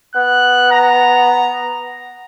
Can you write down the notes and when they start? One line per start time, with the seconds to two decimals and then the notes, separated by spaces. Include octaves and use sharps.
0.15 B3 F#6
0.71 A#5